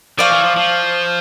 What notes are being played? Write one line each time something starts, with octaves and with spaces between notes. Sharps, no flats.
F3 D5 F5 C#6
E3
F3
F3